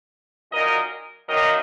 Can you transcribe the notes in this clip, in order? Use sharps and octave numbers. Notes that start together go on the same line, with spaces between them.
A#2 F#3 D#4 A#4 D#5
F#2 D#3 F#3 A#3 D#4 A#4 D#5